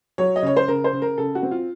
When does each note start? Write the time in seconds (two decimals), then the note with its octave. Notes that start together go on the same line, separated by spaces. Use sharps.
0.18 F#3 C#5
0.36 D#5
0.42 C#3 C#5
0.56 C5
0.68 C#3 A#4
0.84 C5
0.93 C#3
1.02 A#4
1.18 C#3 A4
1.35 F#4
1.42 C4
1.51 F4